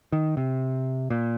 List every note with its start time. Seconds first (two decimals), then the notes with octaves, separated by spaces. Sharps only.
0.12 D#3
0.37 C3
1.10 A#2